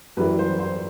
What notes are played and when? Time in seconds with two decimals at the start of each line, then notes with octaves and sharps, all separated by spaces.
0.17 F#2 E3 G3 B4
0.39 C5
0.59 C5